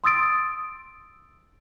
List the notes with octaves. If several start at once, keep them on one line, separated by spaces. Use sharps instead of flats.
C6 D#6 E6 A6 D7